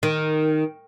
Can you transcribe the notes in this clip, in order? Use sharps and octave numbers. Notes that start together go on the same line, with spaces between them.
D#3